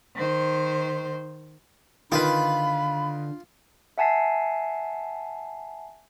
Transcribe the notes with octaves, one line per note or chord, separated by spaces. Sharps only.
D#3 C5
D3 D#3 F4 B4 B5
E5 F#5 G#5 A5 B6 C7